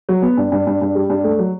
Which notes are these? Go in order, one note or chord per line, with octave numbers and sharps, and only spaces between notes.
F#3
B3
G2
G2
G2
G2
G3
G2
A3
F#3